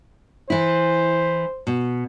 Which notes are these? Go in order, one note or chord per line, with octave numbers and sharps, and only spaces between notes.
E3 E4 C5
B2